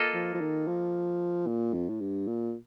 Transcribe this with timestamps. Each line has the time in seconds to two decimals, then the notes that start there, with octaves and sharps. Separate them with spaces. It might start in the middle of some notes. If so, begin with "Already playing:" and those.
Already playing: A#3 F4 A4 D#5
0.13 F3
0.34 F3
0.40 D#3
0.67 F3
1.47 A#2
1.74 F2
1.89 A2
2.00 G2
2.27 A#2